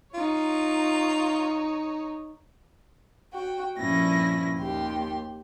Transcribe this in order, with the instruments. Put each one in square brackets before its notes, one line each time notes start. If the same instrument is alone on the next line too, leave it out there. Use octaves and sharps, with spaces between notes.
[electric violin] D#4 C#5 [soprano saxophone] F4
[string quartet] F#4 G5
G2 A#2 F3 C#4 E4 A#6
D#2 G4 C6